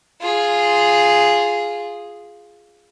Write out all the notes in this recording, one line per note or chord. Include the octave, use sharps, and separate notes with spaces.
F4 G#4